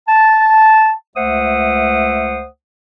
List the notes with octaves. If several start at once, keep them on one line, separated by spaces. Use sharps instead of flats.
A5
C#2 A3 C5 E5 F#5 D#6